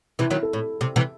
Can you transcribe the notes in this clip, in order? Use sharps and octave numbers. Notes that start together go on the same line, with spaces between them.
C3 E3 E4
D#3 F#3
A4
A2
C3
C3 E3